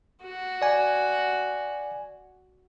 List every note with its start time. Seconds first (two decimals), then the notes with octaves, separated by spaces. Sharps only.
0.23 F#4
0.62 D5 G#5